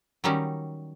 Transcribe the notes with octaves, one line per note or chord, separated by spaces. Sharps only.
D#3 F#3 G3 C#4 D#4